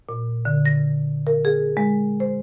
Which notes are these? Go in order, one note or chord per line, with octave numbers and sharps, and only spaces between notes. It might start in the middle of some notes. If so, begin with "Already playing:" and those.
A#2
D3
A#6
A#4
G#4
G#3
C5